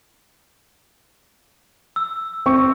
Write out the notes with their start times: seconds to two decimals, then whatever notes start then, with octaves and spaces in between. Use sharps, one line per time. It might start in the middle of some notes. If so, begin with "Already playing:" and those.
1.96 E6
2.46 C4 C#6